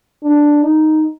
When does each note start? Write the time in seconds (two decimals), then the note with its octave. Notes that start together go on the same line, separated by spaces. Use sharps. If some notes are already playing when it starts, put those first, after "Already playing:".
0.24 D4
0.63 D#4